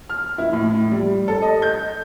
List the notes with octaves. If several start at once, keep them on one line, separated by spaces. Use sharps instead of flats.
F6
E4
A2
G3
A4
D#5
G6